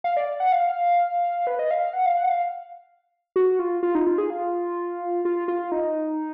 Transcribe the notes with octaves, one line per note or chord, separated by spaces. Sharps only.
F5
D5
F#5
F5
B4
D#5
F5
F#5
F5
F#5
F5
F#4
F4
F4
D#4
F4
G#4
F4
F4
F4
D#4